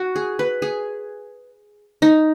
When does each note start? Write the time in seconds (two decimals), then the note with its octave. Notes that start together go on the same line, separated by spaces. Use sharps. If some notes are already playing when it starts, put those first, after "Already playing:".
Already playing: F#4
0.16 G#4
0.39 B4
0.62 G#4
2.02 D#4